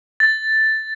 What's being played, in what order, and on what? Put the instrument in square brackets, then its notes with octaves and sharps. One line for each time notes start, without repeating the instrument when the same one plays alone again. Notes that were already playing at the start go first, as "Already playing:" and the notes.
[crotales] A6